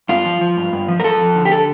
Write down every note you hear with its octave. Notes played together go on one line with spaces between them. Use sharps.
G2 F4
F3
F3
G2
G2
F3
A#4
F3 A4
F2
D3
G4
A4